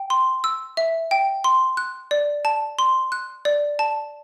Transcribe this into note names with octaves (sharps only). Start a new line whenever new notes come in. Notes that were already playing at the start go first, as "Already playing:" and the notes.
Already playing: G5
C6
E6
E5
G5
C6
F#6
D5
A5
C6
F#6
D5
A5